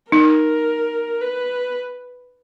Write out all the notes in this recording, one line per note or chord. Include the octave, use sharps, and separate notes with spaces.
D#4 A#4
B4